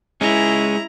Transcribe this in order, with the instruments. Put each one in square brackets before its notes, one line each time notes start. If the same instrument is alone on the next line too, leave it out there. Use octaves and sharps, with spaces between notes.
[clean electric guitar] G#3 C#4 [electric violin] E4 A#5